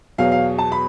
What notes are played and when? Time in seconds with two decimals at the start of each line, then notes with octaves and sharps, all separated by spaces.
0.18 E2 B2 F#3 F5
0.32 F5
0.58 A5
0.72 B5